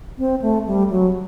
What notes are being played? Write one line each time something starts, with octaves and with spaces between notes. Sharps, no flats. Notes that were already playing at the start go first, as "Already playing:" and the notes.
C4
A3
G3
F#3